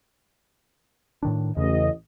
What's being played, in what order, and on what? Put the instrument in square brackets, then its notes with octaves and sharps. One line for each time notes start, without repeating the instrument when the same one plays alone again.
[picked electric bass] A2 D#3 D4
[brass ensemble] A1 D#5 [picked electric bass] E2 C#3